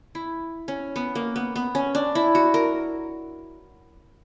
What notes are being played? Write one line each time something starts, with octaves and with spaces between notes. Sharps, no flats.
E4
C#4
B3
A#3
B3
B3
C#4
D4
E4
F#4
A#4